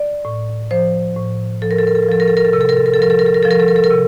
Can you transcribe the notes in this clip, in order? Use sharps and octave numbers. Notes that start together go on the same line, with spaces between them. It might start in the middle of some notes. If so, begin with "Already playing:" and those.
Already playing: D5
A2
F3 C5
A2
F3 A4
A#4
A4
A#4
A4
A#4
F3 A4
A#4
A4
A#4
A4
C3 A#4
A4
A#4
A4
A#4
A4
F3 A#4
A4
A#4
A4
A#4
F3 A4
A#4
A4
A#4
A4
A#4
C3